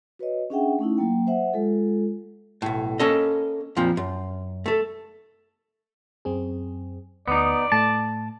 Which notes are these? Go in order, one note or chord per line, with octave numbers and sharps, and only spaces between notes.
F#4 B4 C#5 D#5
C#4 D4 G#4 E5 F#5 G5
A3 C#4 D#4 E4
F#3 A#3 G5
C5 E5 F#5
G#3 F4 A4
B1 A2
A#3 C#4 A4 D#5
F2 A#2 F3 C4
F#2
A3 A4
F#2 C4 G#4
D2 B3 D#4 D5 D6
A2 A3 A5